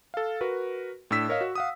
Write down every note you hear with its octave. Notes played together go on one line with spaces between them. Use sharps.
A4 F5
F#4 A#4 B4
A2 D4 E6 B6 E7
A#4 C#5 D#5 F5
F#4
F5 F#5 D#6